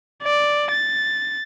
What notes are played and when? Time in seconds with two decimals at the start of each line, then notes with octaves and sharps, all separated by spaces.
0.23 D5
0.71 A6